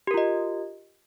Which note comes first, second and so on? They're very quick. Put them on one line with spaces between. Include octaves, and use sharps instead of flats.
G4 A#4 F4 D#5